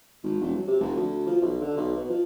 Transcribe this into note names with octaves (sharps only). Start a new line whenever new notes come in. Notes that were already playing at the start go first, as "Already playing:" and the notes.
G#1
E1
F#3
C3
F1
D2
F3
B1
D3
B1
B2
F3